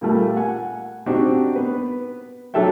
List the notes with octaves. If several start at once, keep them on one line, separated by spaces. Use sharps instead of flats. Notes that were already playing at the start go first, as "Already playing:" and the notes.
A#2 G3 A3 A#3
F#5 G#5
C4 D4 D#4 F#4 G4
B3 B4
F#3 D4 A4 E5 G5